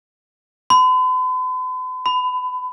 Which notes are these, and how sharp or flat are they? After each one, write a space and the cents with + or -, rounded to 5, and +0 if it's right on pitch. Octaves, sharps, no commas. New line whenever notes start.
B5 +45
B5 +30